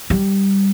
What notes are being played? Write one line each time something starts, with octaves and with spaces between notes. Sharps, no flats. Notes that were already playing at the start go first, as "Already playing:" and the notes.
G3